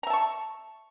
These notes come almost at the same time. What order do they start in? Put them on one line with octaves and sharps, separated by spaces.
A#5 E5 A5 C#6